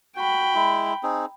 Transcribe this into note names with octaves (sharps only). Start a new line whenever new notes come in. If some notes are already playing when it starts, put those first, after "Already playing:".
F#4 G5 B5
G#3 E4
C4 D#4 G#4